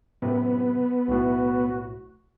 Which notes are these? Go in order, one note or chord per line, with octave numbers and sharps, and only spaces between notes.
F#2 A2 C3 B3
B1 A2 F#4